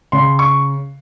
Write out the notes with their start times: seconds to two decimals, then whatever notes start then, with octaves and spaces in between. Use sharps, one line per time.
0.12 C#3 C6
0.39 C#6